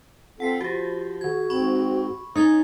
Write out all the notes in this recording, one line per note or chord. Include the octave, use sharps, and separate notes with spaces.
C4 F4 A4 F#5 B6 C7
F3 F#4 G4
D#3 F#4 G#6
G#2 C4 B5 C#6
C#4 D#4 D#6 G#6 A6